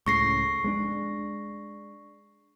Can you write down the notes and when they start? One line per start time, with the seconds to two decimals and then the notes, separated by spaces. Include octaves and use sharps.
0.06 C#2 A2 C#3 C#6 A#6 C7
0.64 G#3 B3 D4